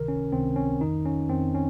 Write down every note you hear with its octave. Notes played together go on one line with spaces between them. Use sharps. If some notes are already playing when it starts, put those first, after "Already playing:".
Already playing: C#2 C3 D#3 A#4
C#4
C#2 C3 D#3 C4
C#4
F2 D#3 D#4
C#4
F2 D#3 C4
C#4